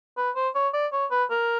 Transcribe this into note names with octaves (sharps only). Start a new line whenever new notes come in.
B4
C5
C#5
D5
C#5
B4
A#4